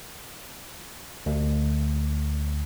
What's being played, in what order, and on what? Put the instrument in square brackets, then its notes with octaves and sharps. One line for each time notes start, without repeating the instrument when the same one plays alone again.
[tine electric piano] D2